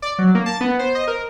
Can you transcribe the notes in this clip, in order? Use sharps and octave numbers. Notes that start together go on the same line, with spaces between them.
D5
F#3
A#3
A5
B3
C5
D#5
A#4